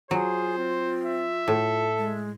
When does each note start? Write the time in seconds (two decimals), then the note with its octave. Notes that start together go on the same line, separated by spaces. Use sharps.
0.11 F#3 F4 G#4 C5
0.57 C4
1.05 E5
1.48 A2 A4
1.99 G#3